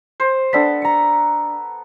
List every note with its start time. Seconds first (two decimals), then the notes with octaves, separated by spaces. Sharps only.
0.20 C5
0.53 B3 D4 A4 D5 B6
0.82 A#5 C#7